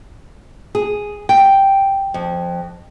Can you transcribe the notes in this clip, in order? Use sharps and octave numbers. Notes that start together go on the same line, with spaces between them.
G#4
G5
F2